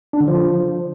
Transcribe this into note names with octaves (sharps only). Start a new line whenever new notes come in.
D4
D3
F3